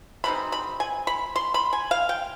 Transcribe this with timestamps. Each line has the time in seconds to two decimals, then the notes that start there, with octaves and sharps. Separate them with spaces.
0.24 B2 G#3 C4 D#4 B5
0.52 B5
0.80 G#5
1.07 B5
1.36 C6
1.54 B5
1.73 G#5
1.91 F5
2.09 G5